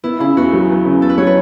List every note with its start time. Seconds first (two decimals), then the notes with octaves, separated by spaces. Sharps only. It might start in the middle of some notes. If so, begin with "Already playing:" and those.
0.04 B3 E4
0.20 C#3 E4
0.37 E2 F#4
0.53 F#3
0.69 B3
0.85 C#3
1.01 E2 A4
1.09 B4
1.18 F#3 C#5
1.26 B4